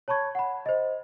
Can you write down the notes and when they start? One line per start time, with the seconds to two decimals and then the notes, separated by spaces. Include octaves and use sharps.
0.08 C#5 A5 B5 C#6 G#6
0.35 F#5 B5
0.66 C5 D#5